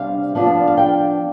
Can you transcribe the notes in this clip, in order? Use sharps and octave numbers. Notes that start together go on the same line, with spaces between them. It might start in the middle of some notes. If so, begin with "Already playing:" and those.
Already playing: C3 G3 B3 D4 F5
F3 B3 D4
F5
G5